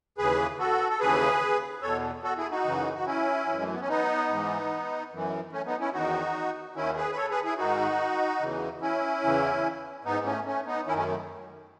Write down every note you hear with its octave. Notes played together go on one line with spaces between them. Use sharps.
D#2 C#3 E3 G#4 B4
F#4 A4
A4
D#2 C#3 E3 G#4 B4
E2 B2 A4 C#5
F#4 A4
E4 G#4
D#4 F#4
F#2 C#3 E3
F#4
C#4 E4
F#2 E3
G#3
A3
B3
C#4
B3 D#4
G#2 E3
F#2 E3
A3 C#4
B3 D#4
C#4 E4
E2 D#3 D#4 F#4
D#2 D#3 C#4 E4
G#4 B4
B4
A4 C#5
G#4 B4
E4 G#4
G#2 D#3 D#4 F#4
E2 C#3 E3
C#4 E4
E2 C#3 E3
G#2 E3 B3 D#4
A3 C#4
A3 C#4
B3 D#4
F#2 D#3 C#4 E4
A3 C#4
A3